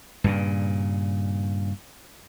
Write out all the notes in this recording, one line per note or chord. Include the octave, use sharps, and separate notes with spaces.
G2 A#2 C#3